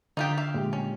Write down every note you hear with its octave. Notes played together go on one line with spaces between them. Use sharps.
D3 D#4 F4 G4
E5 F5
A#2 G#3 G4
C#4